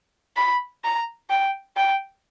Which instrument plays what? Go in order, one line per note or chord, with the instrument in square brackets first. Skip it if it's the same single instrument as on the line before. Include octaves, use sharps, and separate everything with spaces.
[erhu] B5
A#5
G5
G5